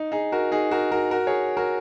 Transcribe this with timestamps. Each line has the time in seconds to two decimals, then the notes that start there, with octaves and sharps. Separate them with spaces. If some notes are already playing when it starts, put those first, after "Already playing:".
Already playing: D#4
0.12 D#4 G#4
0.32 F#4 A#4
0.52 D#4 G#4
0.71 F#4 A#4
0.92 F#4 A#4
1.11 F#4 A#4
1.27 G#4 C#5
1.57 F#4 A#4